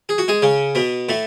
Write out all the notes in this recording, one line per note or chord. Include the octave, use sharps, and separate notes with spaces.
G#4
F#4
G#3 G#4
C#3 C#4
B2 B3
A2 A3